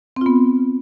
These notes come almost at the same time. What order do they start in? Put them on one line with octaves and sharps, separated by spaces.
C4 F4 B3